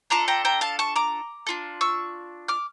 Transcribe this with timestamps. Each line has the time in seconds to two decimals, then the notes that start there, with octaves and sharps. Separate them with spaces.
0.10 D4 F4 A4 A#5 D6
0.28 G5 A#5
0.45 G5 A#5
0.61 F5 A5
0.79 A5 C#6
0.96 A#5 D6
1.47 D4 F4 A4
1.81 C#6 E6
2.48 D6 F6